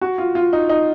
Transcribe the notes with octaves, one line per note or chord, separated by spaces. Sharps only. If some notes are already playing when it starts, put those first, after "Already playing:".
F#4
F4
F4
D#4
D#4